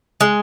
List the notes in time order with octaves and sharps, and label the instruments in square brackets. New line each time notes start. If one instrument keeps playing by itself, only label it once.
[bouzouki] G#3